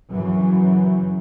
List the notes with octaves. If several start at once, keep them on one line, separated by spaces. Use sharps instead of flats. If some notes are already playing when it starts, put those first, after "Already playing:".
F#2 C#3 E3 F#3